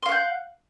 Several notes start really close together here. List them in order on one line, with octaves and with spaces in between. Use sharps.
C6 F5 F#5 G6